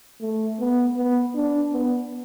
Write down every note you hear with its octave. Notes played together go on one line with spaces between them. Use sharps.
A3
B3
B3
D4
B3